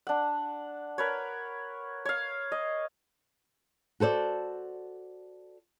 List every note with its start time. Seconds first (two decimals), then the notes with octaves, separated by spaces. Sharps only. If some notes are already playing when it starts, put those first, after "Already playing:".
0.07 D4 F#5
0.98 A#4 B4 C#5
2.05 C#5 F5
2.52 D#5
4.00 F#4 A4 C5 D5